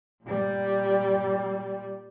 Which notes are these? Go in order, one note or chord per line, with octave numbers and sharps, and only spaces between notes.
A#2 G3